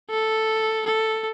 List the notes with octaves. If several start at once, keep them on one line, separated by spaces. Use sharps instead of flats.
A4
A4